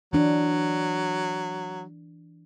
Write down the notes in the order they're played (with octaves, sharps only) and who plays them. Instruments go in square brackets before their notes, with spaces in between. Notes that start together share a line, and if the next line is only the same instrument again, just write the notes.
[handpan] E3 D4 [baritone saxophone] F#3